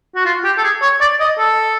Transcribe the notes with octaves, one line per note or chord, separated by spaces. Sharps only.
F#4
F4
G4
A4
G#4
C#5
D5
D#5
A4